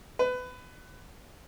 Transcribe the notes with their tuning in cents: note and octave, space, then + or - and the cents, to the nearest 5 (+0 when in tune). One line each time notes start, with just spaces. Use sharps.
B4 +25